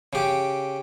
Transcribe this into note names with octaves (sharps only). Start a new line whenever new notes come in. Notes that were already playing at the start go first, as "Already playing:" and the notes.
C#3 G4